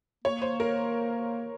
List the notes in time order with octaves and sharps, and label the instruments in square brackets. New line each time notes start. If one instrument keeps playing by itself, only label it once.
[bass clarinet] A#3 [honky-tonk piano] C#5
[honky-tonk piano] C5
A#4